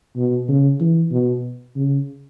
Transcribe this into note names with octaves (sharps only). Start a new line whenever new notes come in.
B2
C#3
E3
B2
C#3